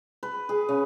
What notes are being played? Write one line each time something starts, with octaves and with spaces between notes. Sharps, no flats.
B4
G#4
C#3